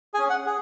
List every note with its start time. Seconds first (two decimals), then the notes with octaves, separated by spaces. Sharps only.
0.14 G#4 G#5
0.18 C#4
0.30 F#5
0.46 G#4